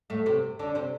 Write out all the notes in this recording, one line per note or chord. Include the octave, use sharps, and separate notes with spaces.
A2 A3
C3 C4
D3 D4
C3 C4